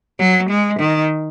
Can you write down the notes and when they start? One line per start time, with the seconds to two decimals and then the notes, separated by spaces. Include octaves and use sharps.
0.19 F#3
0.49 G#3
0.79 D#3